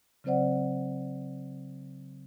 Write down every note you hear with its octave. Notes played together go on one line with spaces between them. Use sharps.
C#3 F#3 C4 C5 D5 F#5